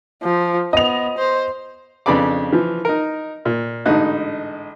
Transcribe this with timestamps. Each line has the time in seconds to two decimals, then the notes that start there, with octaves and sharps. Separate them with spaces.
0.23 F3
0.73 B3 D#5 F7
1.18 C5
2.06 F2 C#3 D4 B4 D5 D6
2.53 E3 F3
2.85 D#4 A#4
3.45 A#2
3.86 A1 G#2 D3 D#4 F#6